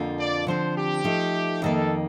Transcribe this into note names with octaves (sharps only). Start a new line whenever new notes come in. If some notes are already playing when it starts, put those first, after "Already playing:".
Already playing: F2 D3 F3 A#3 F4
D5
D3 F3 C4 C5
G4
F3 A3 D#4
F2 D#3 A#3 A4